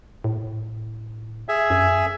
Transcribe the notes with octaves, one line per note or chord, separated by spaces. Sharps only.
A2
G#4 E5 G#5
F#2